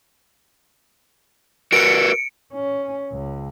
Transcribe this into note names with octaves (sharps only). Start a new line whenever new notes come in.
F#4 A#4 B4 C#7 D7
C#4
C#2